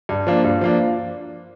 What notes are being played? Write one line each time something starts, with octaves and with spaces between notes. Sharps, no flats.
G2
F3 A#3 D4
G2
F3 A#3 D4